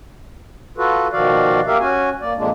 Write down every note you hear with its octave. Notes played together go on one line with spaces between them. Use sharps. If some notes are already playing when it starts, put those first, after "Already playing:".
F4 F#4 A4 B4
B2 D#3 F3 F#4 D5 F5
A#3 G4 A#4 E5 F5
C#4 F#4 G#5
A#3 D5
F2 A#2 G#3 A#3 D4